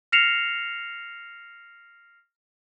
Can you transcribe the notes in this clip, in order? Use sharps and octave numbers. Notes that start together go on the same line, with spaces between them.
F6 A#6 C7 C#7 E7 F7